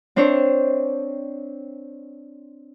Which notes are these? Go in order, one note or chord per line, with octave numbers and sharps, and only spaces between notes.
C4 D4 C5 C#5